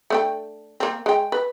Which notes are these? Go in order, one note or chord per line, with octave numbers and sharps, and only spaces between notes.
A3 D4 G5
A#3 C4
G#3 G5
B4